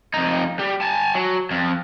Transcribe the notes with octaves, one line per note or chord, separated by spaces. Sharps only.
F2 D#4
G3
G#5 A5
F#3
F2